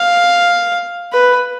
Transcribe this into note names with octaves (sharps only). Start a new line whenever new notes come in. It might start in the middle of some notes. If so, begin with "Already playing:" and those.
Already playing: F5
B4